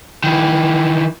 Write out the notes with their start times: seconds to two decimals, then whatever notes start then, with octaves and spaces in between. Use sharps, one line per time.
0.24 D#3 E3